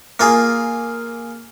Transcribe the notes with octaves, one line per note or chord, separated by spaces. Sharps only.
A#3 F4 G#4